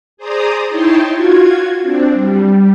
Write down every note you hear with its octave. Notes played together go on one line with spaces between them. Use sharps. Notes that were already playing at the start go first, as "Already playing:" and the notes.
G#4 C5 D5 A#5 D#6
D#4 E4 C#5 G5 A5 C6
F4 F#4 G#6
C4 D4
G3